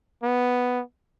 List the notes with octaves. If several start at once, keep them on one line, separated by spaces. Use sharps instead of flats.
B3